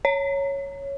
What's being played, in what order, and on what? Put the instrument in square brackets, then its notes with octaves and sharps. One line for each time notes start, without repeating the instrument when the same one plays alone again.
[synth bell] C#5